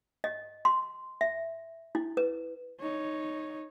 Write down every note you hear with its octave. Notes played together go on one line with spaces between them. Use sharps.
D#5
C6
E5
E4
B4
D#4 C#5